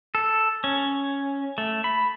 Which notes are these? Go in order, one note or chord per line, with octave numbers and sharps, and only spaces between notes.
A4
C#4
A3
B5